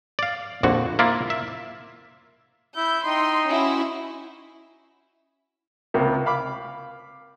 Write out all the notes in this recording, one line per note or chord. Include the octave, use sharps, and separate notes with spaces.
D5 F5
A#1 F2 D3 F#4
A#3 E4 F4 D5
E5
E4 G6
D#4 G5 C6
C#4 E4 F#4
C#2 C3 A#3
F5 B5 D6